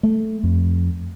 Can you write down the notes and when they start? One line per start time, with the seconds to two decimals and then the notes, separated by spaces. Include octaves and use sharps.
0.03 A3
0.43 F2